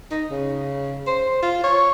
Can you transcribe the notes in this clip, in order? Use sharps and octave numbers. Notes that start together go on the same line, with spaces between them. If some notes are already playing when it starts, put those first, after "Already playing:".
D#4
C#3
C5
F4
C#5